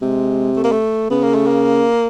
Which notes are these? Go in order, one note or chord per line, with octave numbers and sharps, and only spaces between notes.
C3 G#3
A3
A#3
A3
C#3 B3
A#3
A3
A#3